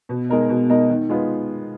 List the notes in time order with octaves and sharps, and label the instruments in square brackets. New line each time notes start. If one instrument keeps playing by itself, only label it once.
[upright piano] B2
G#3 D#4 A#4 D#5
B2
G#3 D#4 A#4 D#5
D#3
G#3 B3 F4